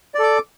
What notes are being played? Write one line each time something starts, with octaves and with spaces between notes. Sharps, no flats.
A4 D5 D6